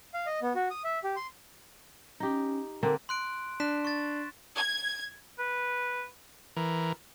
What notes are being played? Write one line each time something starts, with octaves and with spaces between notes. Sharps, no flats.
F5
D#5
B3
F#4
D#6
E5
G4
C6
C#4 D#4 G4
D3 A#3 C4 A#4
C6 F#6 D7
D4 F#6 B6 E7
C#6 A6
G#6
B4
E3 A#4